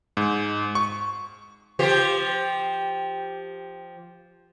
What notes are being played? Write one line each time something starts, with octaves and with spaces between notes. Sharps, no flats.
G#2
C#6
F3 G4 C5